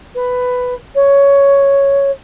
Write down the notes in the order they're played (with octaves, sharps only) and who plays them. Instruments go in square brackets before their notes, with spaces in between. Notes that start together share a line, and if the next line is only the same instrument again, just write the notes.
[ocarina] B4
C#5